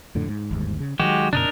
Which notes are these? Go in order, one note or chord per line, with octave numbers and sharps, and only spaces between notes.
F2 A2 D3
G#2
G1 D#2 G#2
C#3
D#3 E3 F#3 G#3 F#4 G4
F2 A#2 C#3 D4 D#4 A#4